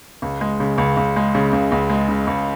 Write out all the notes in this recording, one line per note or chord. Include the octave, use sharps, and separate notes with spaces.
C#2
G#3
C#3
C#2
C#2
G#3
C#3
C#2
C#2
G#3
C#3
C#2